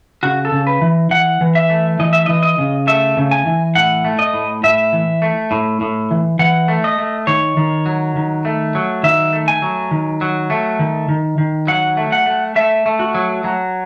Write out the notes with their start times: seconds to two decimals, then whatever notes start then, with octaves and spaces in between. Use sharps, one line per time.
0.23 C#3 F#4
0.45 A4
0.52 C#3
0.67 B4
0.81 E3
1.11 E3 F#5
1.41 E3
1.55 E5
1.70 A3
1.99 E3 D#5
2.13 E5
2.26 E3 D#5
2.43 D#5
2.58 C#3
2.87 A3 E5
3.17 C#3
3.31 G#5
3.46 E3
3.75 A2 F#5
4.05 A3
4.19 D#5
4.34 A2
4.63 A2 E5
4.93 E3
5.22 A3
5.51 A2
5.81 A2
6.11 E3
6.39 E3 F#5
6.68 A3
6.84 D#5
6.98 A3
7.27 D#3 C#5
7.57 D#3
7.86 F#3
8.16 D#3
8.45 A3
8.75 F#3
9.03 D#3 E5
9.33 A3
9.48 G#5
9.62 F#3
9.91 D#3
10.21 F#3
10.50 A3
10.79 D#3
11.09 D#3
11.38 D#3
11.67 F#3 F#5
11.97 A3
12.12 F#5
12.26 A3
12.56 A3 E5
12.86 A3
12.99 F#4
13.15 F#3
13.44 F#3